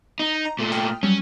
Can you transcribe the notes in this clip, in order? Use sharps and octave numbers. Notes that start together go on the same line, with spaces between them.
D#4
A#5
A#2 A3
G5 D#6 F6
F#3 G3 C#4